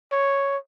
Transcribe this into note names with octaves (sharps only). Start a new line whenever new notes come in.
C#5